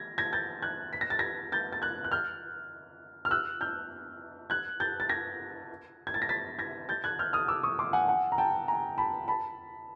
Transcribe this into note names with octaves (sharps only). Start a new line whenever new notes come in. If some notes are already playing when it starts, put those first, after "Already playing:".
Already playing: G#6 A#6
G#6 A#6
G6 A6
F#6 G#6
B6
A#6
A6
G#6 A#6
G6 A6
A6
F#6 G#6
F#6
F6 G6
F6
E6 F#6
F6 G6
F#6 G#6
G6 A6
A6
G#6 A#6
G#6
A6
A#6
A6 B6
G#6 A#6
G6 A6
F#6 G#6
F6 G6
D#6 F6
D6 E6
C#6 D#6
C6 D6
F#5 G#5
F#5 G#5
A#5
G5 A5
G#5 A#5
A5 B5
A5 B5